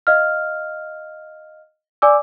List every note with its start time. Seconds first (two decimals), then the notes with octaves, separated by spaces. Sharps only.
0.07 D#5 F5 F6
2.02 D5 G#5 D6 E6